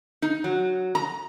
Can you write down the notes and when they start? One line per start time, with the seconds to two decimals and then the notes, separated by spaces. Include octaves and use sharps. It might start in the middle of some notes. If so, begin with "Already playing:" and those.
0.22 D#4
0.44 F#3
0.95 A#5